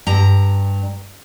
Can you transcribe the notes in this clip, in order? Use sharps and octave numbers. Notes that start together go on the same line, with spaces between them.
G2 A#5